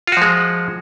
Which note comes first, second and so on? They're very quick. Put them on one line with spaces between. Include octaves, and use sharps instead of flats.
F4 F#4 F3 G#3